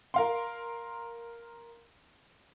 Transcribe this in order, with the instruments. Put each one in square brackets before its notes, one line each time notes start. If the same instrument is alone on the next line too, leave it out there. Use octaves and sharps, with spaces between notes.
[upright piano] A#4 F5 C6